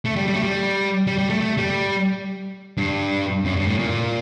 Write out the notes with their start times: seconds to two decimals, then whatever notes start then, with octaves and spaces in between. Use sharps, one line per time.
0.05 A3
0.16 G3
0.28 G3
0.35 A3
0.43 G3
1.07 G3
1.18 G3
1.30 A3
1.41 A3
1.58 G3
2.77 G2
3.45 F#2
3.56 G2
3.67 A2
3.79 A#2